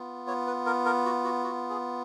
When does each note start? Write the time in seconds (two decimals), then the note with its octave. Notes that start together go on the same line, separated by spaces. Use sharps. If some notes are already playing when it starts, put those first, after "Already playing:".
Already playing: B3 F4
0.27 C#5
0.47 B4
0.66 A#4
0.86 A#4
1.05 F#4
1.24 F#4
1.44 F#4
1.70 G#4